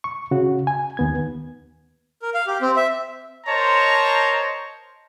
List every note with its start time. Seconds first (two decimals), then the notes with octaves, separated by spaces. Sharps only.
0.04 C#6
0.31 C#3 F#4
0.67 G#5
0.97 D#2 B3 G#6
2.22 A#4
2.34 F5
2.47 G4
2.61 C4
2.76 E5
3.46 A#4 C5 C#5 D#5 A5 A#5